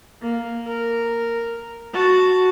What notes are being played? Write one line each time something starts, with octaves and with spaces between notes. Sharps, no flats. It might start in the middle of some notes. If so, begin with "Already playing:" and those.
A#3
A#4
F#4 A5